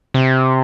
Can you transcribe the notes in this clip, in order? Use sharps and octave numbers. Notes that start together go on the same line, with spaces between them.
C3